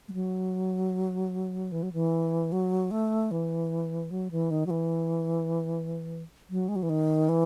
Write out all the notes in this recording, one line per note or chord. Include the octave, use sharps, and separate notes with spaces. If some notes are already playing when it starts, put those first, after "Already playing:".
G#3
F#3
E3
F#3
E3
F#3
A3
E3
F#3
E3
D#3
F#3
E3
F#3
G#3
F#3
E3
D#3
E3